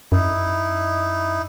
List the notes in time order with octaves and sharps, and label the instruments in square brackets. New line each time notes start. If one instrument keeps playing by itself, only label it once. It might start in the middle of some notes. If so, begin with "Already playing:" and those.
[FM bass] F#2 [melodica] D#4 E4